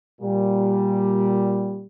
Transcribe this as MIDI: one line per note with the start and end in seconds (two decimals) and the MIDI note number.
0.21 1.85 46
0.21 1.85 55